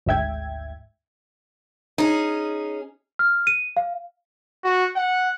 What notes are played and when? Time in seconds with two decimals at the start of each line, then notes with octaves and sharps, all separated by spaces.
0.06 G#1 D2 G#2 E5 G5 G#6
1.98 C#4 D#4 G#4
3.19 F6
3.47 D#7
3.77 F5
4.64 F#4
4.96 F#5